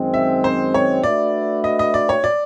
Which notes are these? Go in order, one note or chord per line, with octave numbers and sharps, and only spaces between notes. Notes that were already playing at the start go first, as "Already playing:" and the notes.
Already playing: F#2 D#3 G#3 C4
E5
C5
C#5
A3 D4 F#4 B4 D5 E5
D#5
D#5
D5
C#5
D5